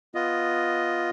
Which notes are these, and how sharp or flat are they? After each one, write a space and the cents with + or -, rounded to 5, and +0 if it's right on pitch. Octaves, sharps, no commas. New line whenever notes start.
B3 +0 F4 +0 D#5 +0